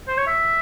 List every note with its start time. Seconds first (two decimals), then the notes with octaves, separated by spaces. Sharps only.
0.08 C5
0.18 C#5
0.27 E5